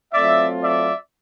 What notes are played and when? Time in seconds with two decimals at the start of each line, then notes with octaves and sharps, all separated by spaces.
0.13 F#3 A3 C4 F4 D5 E5
0.61 D5 E5